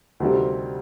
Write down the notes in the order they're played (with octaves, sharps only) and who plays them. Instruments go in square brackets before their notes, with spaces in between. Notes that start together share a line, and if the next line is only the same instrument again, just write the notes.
[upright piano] D2 C3 D#3 G3 C4